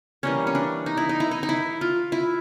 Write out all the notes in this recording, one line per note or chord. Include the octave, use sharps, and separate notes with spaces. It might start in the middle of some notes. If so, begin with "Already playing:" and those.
E3 G3 A#3 C#4
C#4
D4
D#4
E4
D#4
E4
D#4
D#4
E4
F4
E4